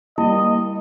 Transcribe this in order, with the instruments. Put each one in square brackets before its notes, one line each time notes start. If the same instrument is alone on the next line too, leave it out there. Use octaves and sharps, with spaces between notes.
[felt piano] G3 [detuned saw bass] A#3 [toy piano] E4 [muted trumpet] D#5